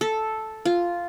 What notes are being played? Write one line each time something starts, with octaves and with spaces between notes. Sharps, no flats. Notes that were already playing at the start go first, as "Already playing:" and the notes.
A4
F4